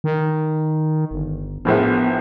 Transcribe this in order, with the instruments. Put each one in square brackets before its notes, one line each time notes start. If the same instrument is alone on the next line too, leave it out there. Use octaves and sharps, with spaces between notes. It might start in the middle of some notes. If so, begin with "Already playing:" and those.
[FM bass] D#3
G1
[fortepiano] A#1 A2 F3 [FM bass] B3